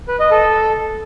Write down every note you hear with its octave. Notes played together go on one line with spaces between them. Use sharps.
B4
D#5
A4